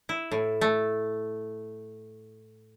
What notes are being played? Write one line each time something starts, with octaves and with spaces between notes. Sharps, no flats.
E4
A2
A3